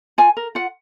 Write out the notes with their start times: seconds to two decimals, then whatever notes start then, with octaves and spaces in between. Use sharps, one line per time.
0.18 F4 G#5
0.37 A#4
0.55 F4 F#5